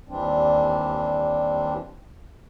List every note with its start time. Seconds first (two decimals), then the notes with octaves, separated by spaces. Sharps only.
0.09 D#2 E3 G3 C4 D4